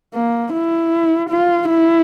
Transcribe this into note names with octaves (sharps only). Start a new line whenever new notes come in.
A#3
E4
F4
E4